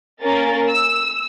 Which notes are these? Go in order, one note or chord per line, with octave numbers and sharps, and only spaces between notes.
A#3 C#4 A#4 A6
E6